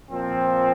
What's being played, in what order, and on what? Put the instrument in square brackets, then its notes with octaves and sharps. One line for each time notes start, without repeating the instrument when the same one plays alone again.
[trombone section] A#2 F3 C4